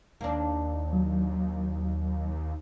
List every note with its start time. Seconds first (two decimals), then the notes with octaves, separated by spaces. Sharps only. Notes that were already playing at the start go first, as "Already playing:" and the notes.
0.21 D#2 A#3 D4
0.93 F#3